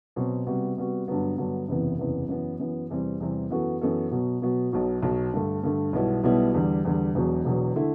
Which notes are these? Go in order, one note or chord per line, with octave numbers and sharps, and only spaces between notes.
B2 F#3 C4
C3 G3 B3 F#4
C3 G3 B3 F#4
G2 D3 F#3 B3
G2 D3 F#3 B3
F#1 E2 C3 E3 B3
F#1 E2 C3 E3 B3
F#2 E3 B3
F#2 E3 B3
E2 C3 E3 G3 C4
E2 C3 E3 G3 C4
F#2 E3 B3 F#4 A4
F#2 E3 B3 F#4 A4
B2 F#3 B3 F#4
B2 F#3 B3 F#4
B1 B2 F#3
B1 B2 F#3
G2 D3 A3
G2 D3 A3
B1 B2 G3 B3 E4
B1 B2 G3 B3 E4
E2 D3 G3
E2 D3 G3
E1 E2 B2 F#3
E1 E2 B2 F#3
D3 A3 E4